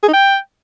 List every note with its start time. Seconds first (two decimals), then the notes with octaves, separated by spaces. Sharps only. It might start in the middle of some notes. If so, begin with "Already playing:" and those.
0.03 G#4
0.08 D#4
0.13 G5